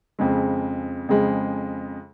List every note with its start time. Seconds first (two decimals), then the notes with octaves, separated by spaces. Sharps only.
0.19 F2 C#3 G#3
1.09 F2 C#3 G#3